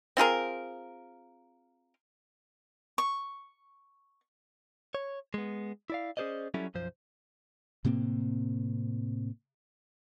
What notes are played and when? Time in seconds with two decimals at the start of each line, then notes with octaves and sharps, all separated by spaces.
0.17 C4 F4 G#4 A#4
2.98 C#6
4.95 C#5
5.34 G#3 B3
5.90 E4 D5 F5
6.17 C#4 G#4 A4 C5 D5 D#5
6.54 F#3 G3 C#4 E4 A4
6.74 B1 F#2 F3 C5
7.85 A2 C3 A#3 C4